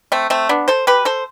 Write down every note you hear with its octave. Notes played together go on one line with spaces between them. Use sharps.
A3 C4
A3 C4
B3 D4
A4 C5
G4 B4
A4 C5